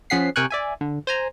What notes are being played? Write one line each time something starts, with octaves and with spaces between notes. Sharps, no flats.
F3 C#4 G#4 F#5 B6 C7
C3 A#4 G5 G#5 C#6 F#6
D5 E5 G#5
D3
C5 G#5 A#5